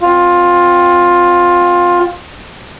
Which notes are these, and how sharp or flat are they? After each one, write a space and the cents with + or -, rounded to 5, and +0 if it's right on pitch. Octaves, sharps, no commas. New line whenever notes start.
C4 +0 F4 +15